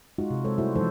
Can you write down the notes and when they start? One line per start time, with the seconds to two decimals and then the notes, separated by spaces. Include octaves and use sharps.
0.18 G#3 D#4 F4 F#4
0.31 C3
0.45 G#3 A4 C5 C#5
0.58 G3 A3 E4 F#4 C5
0.76 E3 F3 G#3 D#4 A4 C5